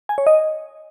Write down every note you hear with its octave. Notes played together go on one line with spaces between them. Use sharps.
G#5
C#5
D#5